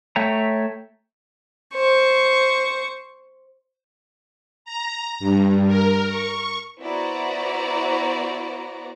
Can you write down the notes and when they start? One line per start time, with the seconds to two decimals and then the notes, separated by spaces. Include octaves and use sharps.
0.16 A3 C#5 E5 G5 A#5
1.75 C5 C#6
4.65 A#5
5.20 G2
5.68 A#4
6.09 C#6
6.81 B3 E4 F#4 C5 D5 A#5